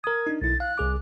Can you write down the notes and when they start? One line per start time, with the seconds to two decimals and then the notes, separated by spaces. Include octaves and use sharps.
0.04 A#4 D#6 G#6
0.27 D4 D#4
0.42 B1 E4 A6
0.60 F5 F#6
0.78 C2 G#4 D6